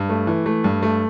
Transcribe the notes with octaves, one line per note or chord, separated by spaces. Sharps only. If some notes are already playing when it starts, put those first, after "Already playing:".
Already playing: G2
A3
E3
A3
G2
A3